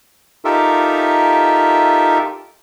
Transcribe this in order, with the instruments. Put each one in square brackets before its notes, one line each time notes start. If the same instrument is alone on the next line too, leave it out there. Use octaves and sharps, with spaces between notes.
[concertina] D#4 F4 G4 A4 A#4 E5